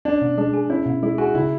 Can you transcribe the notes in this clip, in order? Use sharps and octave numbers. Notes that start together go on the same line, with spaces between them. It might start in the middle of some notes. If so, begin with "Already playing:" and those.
C#4 D4
B2
G#3 D4
G#4
C#4 E4
B2
G#3 E4
F#4 G#4
C#3 E4